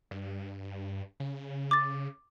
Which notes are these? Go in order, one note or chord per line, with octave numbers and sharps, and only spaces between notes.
G2
C#3
D6 A6